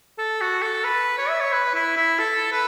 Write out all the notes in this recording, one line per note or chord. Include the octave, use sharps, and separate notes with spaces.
A4
F#4
A4
B4
C#5
E5
C#5
B4
E4
E4
A4
B4